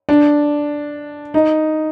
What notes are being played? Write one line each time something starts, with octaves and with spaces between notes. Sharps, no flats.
D4
D#4